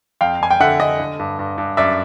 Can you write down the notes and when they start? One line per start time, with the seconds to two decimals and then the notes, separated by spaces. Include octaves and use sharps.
0.21 F2 F5 G5
0.41 F2 G#5
0.51 G5
0.60 D3 E5 F#5
0.79 D3 D#5
1.00 D3
1.19 G2
1.39 G2
1.58 G2
1.77 F#2 D5 E5